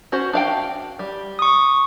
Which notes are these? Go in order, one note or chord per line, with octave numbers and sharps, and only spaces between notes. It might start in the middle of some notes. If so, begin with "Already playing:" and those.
C#4 F#4 C5
D4 F5 G5
G3
C#6 D#6